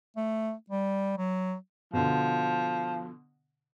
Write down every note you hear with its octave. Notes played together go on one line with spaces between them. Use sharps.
A3
G3
F#3
B2 D3 F3